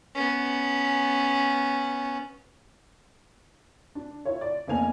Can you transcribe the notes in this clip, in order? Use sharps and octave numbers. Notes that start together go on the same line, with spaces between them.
B3 C#4
D4
E4 F4 C#5
D5
F1 A#3 B3 G#5 F7